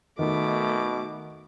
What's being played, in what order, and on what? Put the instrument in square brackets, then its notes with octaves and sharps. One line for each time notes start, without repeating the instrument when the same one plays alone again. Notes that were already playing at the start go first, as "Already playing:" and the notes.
[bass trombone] B2 [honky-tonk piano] D#3 [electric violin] A3 D6